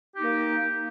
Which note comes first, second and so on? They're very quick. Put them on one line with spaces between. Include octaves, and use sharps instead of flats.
G4 D#4 A#3